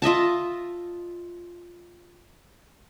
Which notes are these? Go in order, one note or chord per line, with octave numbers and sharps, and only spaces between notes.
F4 D#5 E5 A5